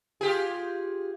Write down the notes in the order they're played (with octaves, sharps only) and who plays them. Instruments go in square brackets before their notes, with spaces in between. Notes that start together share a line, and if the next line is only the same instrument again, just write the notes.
[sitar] F4 G4 G#4